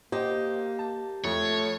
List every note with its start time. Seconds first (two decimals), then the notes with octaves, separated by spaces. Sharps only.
0.12 A#3 G4 C5 D#5
0.79 A5
1.24 F2 A3 C#5